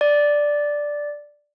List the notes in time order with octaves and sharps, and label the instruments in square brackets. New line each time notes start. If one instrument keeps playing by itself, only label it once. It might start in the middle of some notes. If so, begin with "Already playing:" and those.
[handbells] D5